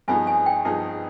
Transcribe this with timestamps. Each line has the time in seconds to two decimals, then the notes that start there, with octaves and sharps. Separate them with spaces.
0.08 G2 F3 B3 D#4 G#4 G#5
0.27 G#5
0.46 G5
0.65 G2 F3 B3 D#4 G#4